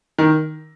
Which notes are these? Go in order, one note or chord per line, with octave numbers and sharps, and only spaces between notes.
D#3